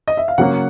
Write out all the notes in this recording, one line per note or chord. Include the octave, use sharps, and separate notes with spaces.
D#5
E5
F5
C#3 F#3 A#3 F#5